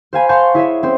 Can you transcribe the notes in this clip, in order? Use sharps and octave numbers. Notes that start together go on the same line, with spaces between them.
C5 F5 G#5 B5
F5 F#5 A5 C6 C#6 G6
E4 G#4 C#5 E5
C4 C#4 C5